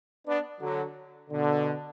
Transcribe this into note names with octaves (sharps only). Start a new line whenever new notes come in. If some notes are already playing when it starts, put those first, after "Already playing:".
B3 D4
D3 F#3
B2 D3